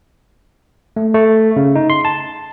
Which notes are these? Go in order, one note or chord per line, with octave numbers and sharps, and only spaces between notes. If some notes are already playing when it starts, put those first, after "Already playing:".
A3
A3
C#3
D#4
C6
A5